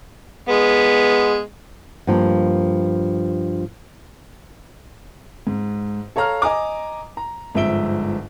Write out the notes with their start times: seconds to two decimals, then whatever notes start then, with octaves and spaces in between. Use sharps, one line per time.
0.49 G#3 B3
2.07 G2 F3 A#3
5.47 G#2
6.16 A4 C#5 F5 A#5 F6
6.42 D#5 G#5 A#5 D6
7.17 A#5
7.55 G1 G#2 F3 E5 D7 G7